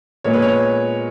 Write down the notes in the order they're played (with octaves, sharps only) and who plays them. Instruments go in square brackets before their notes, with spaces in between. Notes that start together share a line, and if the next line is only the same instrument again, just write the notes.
[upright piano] A#2 G#3 B3 C#5
B4
C#5